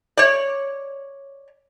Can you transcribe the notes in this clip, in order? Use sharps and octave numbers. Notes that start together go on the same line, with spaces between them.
C#5 D5